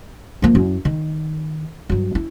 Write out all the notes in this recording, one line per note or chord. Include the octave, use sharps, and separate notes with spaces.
F3 A#3
F#2 E4
D#3
G2 F#3
E4